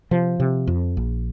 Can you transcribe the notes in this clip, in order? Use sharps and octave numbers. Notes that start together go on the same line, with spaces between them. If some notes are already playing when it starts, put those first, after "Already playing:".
C3 F3
C3
F2
A#1